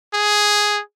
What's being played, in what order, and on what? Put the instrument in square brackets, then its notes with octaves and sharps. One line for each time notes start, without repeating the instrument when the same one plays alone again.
[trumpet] G#4